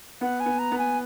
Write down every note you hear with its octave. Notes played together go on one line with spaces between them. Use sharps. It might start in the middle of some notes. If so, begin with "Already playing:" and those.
B3 F#5
G#5
B3
A#5
B3
G#5